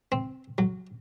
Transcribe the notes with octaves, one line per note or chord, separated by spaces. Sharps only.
C4
F#3